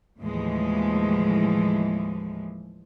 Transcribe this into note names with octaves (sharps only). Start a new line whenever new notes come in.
D#2 A2 E3 F3 G#3